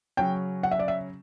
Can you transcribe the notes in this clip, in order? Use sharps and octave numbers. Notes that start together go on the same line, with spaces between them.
C#3 F#3 C#4 G5
F#5
E5
D5
E5